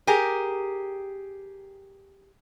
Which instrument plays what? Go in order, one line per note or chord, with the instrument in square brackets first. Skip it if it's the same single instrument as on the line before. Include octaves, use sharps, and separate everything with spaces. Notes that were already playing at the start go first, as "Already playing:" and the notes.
[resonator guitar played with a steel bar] G4 G#4 A#4